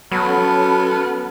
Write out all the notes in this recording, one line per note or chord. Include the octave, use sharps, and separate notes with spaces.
F#3 B3 C#4 A4 A5 B5 F6